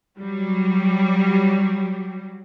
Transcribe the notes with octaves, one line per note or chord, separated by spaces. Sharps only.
F#3 G3